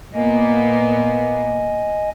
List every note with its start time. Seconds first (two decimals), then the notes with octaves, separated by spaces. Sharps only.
0.14 A#2 A#3 B3 D#5 G#5